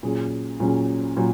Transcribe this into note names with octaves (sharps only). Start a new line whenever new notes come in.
A#2 F#3 C#4 G#4
A#2 F#3 C#4 G#4
A#2 F#3